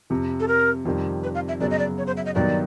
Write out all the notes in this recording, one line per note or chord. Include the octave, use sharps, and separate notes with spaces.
F2 C3 F3
A4
A#4
F2 C3 D#3 G3
B4
F5
E5
F#2 C#3 F#3 B3 D5
D#5
D5
C#5
C5
E5
D#5
G2 D#3 F#3 B3 D5